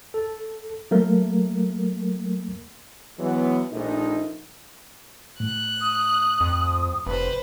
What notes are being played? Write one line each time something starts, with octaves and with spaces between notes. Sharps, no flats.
A4
F#3 A3 A#3 A#4
E3 F#3 G#3 B3
A#1 A3 D#4
A2 F#6
D#6
F2
F1 B4 C5